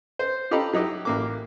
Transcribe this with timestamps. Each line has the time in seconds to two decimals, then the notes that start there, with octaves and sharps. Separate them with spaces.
0.19 C5
0.51 F4 G4 A4 D#5 A#5 B5
0.73 F#3 D#4 E4 G4
1.05 A1 A#3 D6